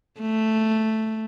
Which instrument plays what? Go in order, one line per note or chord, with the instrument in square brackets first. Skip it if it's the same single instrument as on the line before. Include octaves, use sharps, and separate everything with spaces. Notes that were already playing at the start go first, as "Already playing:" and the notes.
[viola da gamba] A3